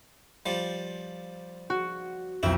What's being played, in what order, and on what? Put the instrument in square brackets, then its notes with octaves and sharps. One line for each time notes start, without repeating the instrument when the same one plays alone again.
[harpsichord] F3 G3
[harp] F#4
[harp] B1 F2 [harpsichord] E4